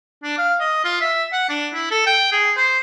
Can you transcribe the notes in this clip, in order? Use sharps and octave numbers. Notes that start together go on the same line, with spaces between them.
D4
F5
D#5
F4
E5
F#5
D4
E4
A4
G5
G#4
C5